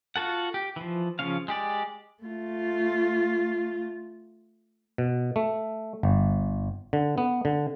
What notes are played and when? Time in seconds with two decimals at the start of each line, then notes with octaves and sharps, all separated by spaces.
0.16 F4 F#4 A4 F#5
0.54 G4
0.76 E3 F3
1.19 C#3 F3 C#4 F5
1.48 G#3 G4 D5
2.23 A3 F4
4.98 B2
5.36 A3
6.03 G1
6.93 D3
7.18 B3
7.45 D3